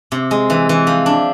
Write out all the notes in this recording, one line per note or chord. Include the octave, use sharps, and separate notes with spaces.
C3
G#3
E3
E3
F3
D4